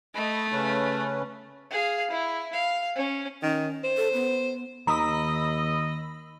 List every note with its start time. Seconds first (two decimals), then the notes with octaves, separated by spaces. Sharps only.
0.15 A3 D#5 B5
0.52 C#3 C#4 B4
1.71 G#4 F5
2.11 E4
2.53 F5
2.96 C#4
3.42 D#3 C#4
3.84 C5
3.97 A4
4.13 B3
4.87 D#2 D#3 D#5 A#5 B5 D#6 E6